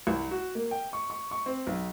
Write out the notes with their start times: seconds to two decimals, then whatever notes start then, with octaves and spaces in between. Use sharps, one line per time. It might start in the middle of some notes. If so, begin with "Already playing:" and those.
0.07 C2
0.31 F#4
0.55 A#3
0.71 G5
0.93 C#6
1.10 C#6
1.31 C#6
1.46 C4
1.67 B1